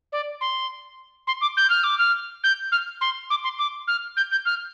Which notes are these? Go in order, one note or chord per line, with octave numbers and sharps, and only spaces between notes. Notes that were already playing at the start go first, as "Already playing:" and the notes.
D5
C6
C6
D6
G6
F6
D6
F6
G6
F6
C6
D6
C6
D6
F6
G6
G6
F6